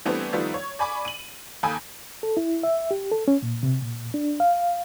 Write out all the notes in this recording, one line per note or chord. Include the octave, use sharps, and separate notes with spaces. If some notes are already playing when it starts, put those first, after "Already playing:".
E3 G3 A3 B3 C4 D4
D#3 F3 G3 A3 B3
C#5
D5 G#5 B5 C#6 D6
D#7 F#7
D#2 A4 G#5 B5 D#6 G6
A4
E4
E5
G4
A4
C#4
A#2
C3
A#2
D4
F5